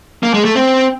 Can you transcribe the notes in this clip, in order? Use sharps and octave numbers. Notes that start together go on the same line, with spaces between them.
A#3
G#3
A3
C4